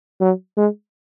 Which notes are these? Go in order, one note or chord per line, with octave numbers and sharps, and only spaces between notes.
F#3
G#3